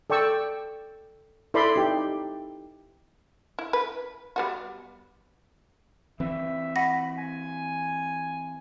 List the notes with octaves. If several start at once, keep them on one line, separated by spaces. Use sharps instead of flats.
A4 D5 G5 C#6 E6
E4 A4 B4 D5 B5 C6
D#4 G4
E4
B4
G3 B3 F#4
E3 C4 E5
F#5 B5 A#6
G#5